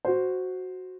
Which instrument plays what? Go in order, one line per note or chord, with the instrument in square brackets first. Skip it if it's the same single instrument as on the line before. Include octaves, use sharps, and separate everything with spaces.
[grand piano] F#4 C5